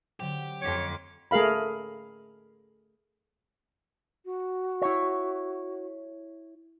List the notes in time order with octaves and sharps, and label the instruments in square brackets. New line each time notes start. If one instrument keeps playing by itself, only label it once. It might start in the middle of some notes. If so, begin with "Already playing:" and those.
[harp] D3 F#3 C4 [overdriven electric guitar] G4
[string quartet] F2 D6 [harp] C#4 [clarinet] C#5
[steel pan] A3 G#4 A#4 F5 B5
[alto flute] F#4
[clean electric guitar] E4 C#5